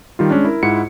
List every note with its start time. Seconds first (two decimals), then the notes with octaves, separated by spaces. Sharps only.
0.19 D#3 G3 F4
0.30 G#3 C#4 D4
0.45 E4 A#4
0.63 G#2 E4 F4 F#5 C#7